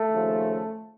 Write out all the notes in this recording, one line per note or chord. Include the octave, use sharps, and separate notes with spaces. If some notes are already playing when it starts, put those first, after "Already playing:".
Already playing: A3
D#2 C#3 F3